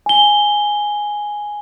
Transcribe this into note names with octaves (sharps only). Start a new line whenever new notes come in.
G#5 G7